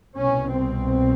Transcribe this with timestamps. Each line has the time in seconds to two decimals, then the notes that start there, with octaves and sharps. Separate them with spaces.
0.16 C2 B2 C#4
0.53 C4